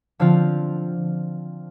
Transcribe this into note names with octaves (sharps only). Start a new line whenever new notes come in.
D3 F3 C4 F4